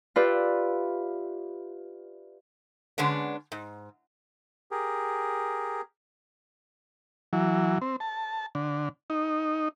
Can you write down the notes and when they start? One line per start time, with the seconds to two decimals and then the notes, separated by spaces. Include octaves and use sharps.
0.16 F4 G4 B4 D5 E5
2.98 D3 G#3 B3 C#4 D4
3.52 G#2
4.71 G4 G#4 A#4
7.33 E3 F#3
7.81 C4
8.00 A5
8.55 D3
9.10 D#4